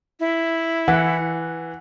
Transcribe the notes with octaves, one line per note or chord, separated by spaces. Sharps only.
E4
E3 F#5